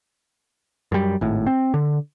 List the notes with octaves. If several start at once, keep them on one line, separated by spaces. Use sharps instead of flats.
F#2 G3
G#1 A2
C4
D3